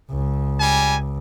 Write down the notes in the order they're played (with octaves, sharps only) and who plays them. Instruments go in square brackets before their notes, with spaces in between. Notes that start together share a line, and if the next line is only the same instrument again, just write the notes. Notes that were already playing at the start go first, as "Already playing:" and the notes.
[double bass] C#2
[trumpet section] G3 G#5